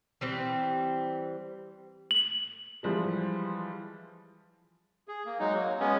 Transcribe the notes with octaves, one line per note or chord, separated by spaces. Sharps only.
E3 G3 C4
F#7
E3 F3 G3 G#3
G#4
A#3
F#3 G#3 D#4
F#3 A#3
G#3 B3 C#4